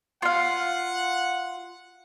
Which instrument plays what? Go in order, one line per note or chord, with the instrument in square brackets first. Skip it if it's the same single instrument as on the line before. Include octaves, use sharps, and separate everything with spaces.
[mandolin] F4 F5 [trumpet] F#5